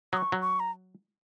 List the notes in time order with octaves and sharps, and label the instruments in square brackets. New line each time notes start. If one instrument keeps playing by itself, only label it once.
[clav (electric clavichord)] F#3 [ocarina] D#6
[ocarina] C#6
[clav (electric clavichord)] F#3
[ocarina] C#6
A#5